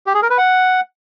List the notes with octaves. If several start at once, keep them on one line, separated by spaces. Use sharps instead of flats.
G4
G#4
A#4
B4
F#5